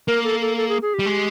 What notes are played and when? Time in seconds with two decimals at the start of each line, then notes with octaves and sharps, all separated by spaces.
0.08 A#3 A#4
0.24 A4
0.41 A4
0.57 A4
0.69 G#4
0.82 G#4
0.94 G4
0.99 G3
1.06 G#3